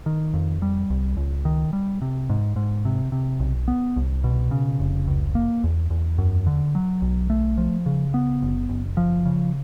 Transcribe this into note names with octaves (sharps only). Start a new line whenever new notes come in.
D#3
F2
G3
C2
C#2
D#3
G3
C3
G#2
G#2
C3
C3
B1
B3
C2
B2
C#3
F1
C#2
A#3
E2
E2
F#2
D3
F#3
B1
A3
F3
C#3
B3
F#1
F#1
F3
C#3